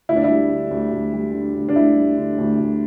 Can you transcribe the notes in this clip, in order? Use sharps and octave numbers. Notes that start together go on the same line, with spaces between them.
D2 E4
D4
E4
G3
D3
D2
D2
G3
D3
D2
D4
D2 E4
G3
D3
D2
D2